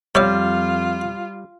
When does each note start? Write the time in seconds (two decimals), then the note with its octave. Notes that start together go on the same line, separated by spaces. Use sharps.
0.15 F2 G3 F4 C#5 E5 F5